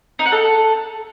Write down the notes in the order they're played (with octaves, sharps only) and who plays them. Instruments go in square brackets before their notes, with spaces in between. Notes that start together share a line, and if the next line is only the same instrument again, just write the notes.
[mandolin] D#4
F#5
A4